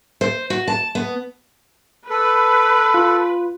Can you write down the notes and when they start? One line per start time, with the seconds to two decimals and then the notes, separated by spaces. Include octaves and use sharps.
0.21 C5
0.50 F#4
0.68 A5
0.95 B3
2.10 A4 B4
2.94 F4